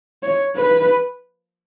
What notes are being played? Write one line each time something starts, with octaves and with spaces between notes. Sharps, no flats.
C#5
B4